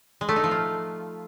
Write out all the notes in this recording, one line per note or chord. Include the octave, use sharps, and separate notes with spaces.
G#3
A3
D#4
F3
F4